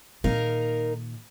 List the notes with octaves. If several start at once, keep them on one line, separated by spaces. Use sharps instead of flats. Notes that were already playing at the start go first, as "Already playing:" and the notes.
A#2 D#3 D#4 A#4 F5